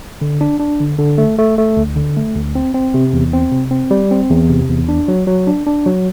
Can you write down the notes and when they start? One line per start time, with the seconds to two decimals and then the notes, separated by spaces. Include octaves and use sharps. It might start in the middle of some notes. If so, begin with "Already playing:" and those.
0.21 D3
0.41 D4
0.60 D4
0.80 D3
0.99 D3
1.18 A3
1.39 A3
1.58 A3
1.77 D2
1.96 D3
2.17 A3
2.35 D2
2.55 C4
2.74 C4
2.94 C3
3.13 E2
3.33 C4
3.52 C3
3.71 C4
3.91 G3
4.11 C4
4.30 E2
4.49 C3
4.69 E2
4.89 D4
5.08 F#3
5.27 F#3
5.47 D4
5.66 D4
5.86 F#3